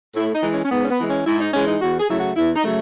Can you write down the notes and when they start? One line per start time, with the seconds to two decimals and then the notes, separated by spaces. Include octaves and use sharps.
0.15 A2 E4
0.33 D#4
0.43 E3 G#3
0.53 C#4
0.64 C#4
0.71 G#2 B3
0.85 C#4
0.90 B3
0.99 E3 G#3
1.08 C#4
1.26 G#2 E4
1.40 D#4
1.53 E3 G#3 C#4
1.67 D#4
1.81 E2 F#4
2.00 G#4
2.09 C#3 F#3 A3 E4
2.18 F#4
2.37 E2 E4
2.55 D#4
2.64 C#3 F#3 A3